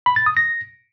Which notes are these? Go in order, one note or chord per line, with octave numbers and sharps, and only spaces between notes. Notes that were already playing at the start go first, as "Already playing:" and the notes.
B5
A6
D#6
A#6